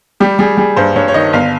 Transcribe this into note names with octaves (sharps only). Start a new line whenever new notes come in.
G3 G4
G3 G#4
G3 G#4
G2 C5
G2 C#5
C#5
D#3 D#5
G1 F5